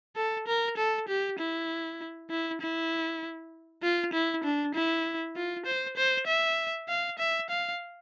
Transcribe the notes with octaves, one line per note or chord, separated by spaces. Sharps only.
A4
A#4
A4
G4
E4
E4
E4
F4
E4
D4
E4
F4
C5
C5
E5
F5
E5
F5